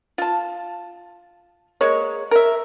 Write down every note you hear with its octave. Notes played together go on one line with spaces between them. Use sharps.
F4 A5
G#3 A#3 C#5
A#4 E5